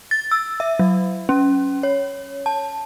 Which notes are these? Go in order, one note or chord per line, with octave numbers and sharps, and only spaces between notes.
A6
E6
E5
F#3
C#4
C#5
A5